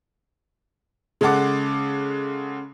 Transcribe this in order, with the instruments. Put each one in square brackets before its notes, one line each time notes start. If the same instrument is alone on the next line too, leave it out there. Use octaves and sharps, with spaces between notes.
[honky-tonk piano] C#3 G#3 A4 F#5 D6